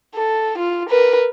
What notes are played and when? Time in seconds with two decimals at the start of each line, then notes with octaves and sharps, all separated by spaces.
0.16 A4
0.59 F4
0.90 A#4 B4